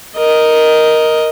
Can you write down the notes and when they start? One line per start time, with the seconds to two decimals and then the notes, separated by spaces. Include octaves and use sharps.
0.17 A#4 D#5